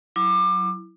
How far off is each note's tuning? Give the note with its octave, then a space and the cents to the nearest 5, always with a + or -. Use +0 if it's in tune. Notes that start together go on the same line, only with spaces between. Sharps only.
F#3 +0 E4 +0 D6 +25